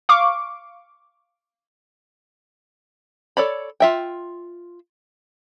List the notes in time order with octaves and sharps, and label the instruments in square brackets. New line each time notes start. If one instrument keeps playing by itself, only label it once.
[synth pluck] F5 C#6 D6
[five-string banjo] A4 C#5 D5 B5
F4 E5 G5